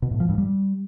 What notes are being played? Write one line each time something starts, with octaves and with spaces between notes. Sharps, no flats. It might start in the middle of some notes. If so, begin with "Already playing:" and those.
B2
A2
F3
G2
G3